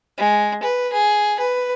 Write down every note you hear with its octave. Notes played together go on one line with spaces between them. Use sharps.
G#3
B4
G#4
B4